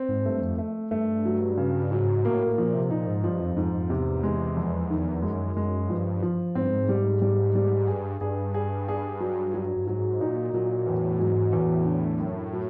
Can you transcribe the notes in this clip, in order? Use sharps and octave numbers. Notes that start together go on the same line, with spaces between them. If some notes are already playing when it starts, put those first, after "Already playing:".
Already playing: C4
G#2
G2 A3
F2
A3
G2 A3
F#3
C#3
G#2 F#3
A2 A#3
A2
A#2 F3
C3
A#2 D#4
G#2
G2 F3
F2
F2 G#2
F2
E2 C3
G#3
F2
D#3
F#2 G#3
F#2 G#3
G2 F3
F3
G#2 C4
G2
G#2
G3
G3
G3
G2 G#4
G2 G#4
G#4
G#4
F#3
F#3
G2
G#2 F#3
A#2 D#4
A#2 F#3
E2 A2
G#2 F#3
E2 A2
D3
F#2
F#3